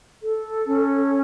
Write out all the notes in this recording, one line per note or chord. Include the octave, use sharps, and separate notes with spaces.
A4
C#4